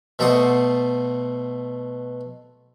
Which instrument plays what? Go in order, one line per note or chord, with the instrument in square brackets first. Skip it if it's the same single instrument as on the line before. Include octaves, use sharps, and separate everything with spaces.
[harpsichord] B2 A3 C5 D5 F#5 D#6